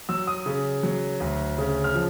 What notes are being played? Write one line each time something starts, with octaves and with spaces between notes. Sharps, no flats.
F#3 E6
D#6
C#3
F#3
D2
C#3
F6
F3